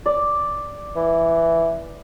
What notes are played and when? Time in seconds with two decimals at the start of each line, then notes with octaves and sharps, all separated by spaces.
0.06 D5
0.96 E3